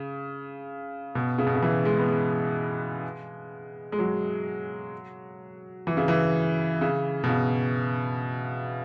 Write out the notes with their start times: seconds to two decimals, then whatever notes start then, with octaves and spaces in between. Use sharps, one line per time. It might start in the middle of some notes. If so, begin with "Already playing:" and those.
Already playing: C#3
1.15 B2
1.38 C#3
1.47 B2
1.55 C#3
1.62 E3
1.85 G#3
1.99 B3
2.09 G#3
3.92 G#3
3.99 F#3
5.87 E3
5.97 C#3
6.08 E3
6.81 C#3
7.24 B2
7.29 C#3